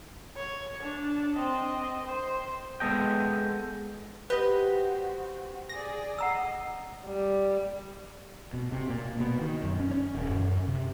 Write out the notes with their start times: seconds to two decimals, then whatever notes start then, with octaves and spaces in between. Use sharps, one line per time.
0.37 C#5
0.82 D4
1.34 C4 D#5
2.04 C5
2.80 G#3 B3 A4 D#5 G5
4.30 F#4 G4 B4 C5 D#5
5.69 G#4 D5 A#6
6.19 D#5 F#5 A#5 E6
7.06 G3
8.54 B2
8.72 C3
8.89 A#2
9.20 B2
9.41 D#3
9.64 F#2
9.80 C#4
9.93 C#4
10.14 D#1
10.30 F#2
10.68 C3